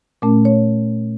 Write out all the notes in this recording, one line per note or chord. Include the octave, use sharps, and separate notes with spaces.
A#2 A3 C#4 A#4
C#5